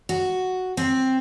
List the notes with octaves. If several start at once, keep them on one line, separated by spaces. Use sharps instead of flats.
F#4
C4